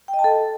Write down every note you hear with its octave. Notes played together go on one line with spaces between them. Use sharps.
G5
D#5
A5
A4